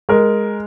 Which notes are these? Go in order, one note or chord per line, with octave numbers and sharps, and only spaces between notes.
G#3 A#4